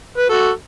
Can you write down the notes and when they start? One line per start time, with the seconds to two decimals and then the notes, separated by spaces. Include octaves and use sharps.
0.18 B4
0.29 F#4 A4